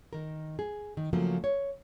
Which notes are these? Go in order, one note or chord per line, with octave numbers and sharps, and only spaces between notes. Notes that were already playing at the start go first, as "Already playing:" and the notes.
D#3 A#4
G#4
D#3
C#3 F3 F#3 A3 A#3
C#5